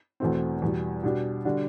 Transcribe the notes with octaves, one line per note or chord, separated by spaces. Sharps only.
E2 B2 A3 C4
E2 B2 G3
B2 G3 D4 G4
D3 G3 D4 F#4